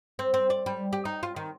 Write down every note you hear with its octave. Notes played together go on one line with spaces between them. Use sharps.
C4
C4
D5
G3
G4
D#4
F4
D#3